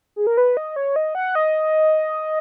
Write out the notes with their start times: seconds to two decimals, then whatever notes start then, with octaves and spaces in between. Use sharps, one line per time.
0.16 G#4
0.27 A#4
0.37 B4
0.57 D#5
0.76 C#5
0.96 D#5
1.15 F#5
1.35 D#5